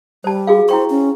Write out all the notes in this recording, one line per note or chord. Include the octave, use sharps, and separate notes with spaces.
G3 C5 A5
F#4 G#4 F5
E4 C5 G5 C#6
C#4